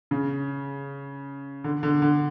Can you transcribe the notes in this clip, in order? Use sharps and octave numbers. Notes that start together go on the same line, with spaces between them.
C#3
D3
D3
D3